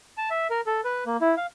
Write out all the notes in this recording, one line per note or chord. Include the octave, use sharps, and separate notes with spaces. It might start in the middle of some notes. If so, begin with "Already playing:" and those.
A5
E5
A#4
A4
B4
A#3
E4
F5